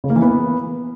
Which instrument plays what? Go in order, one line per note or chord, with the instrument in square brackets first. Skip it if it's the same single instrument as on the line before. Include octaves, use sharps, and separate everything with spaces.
[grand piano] C#3
A#3
E3
B3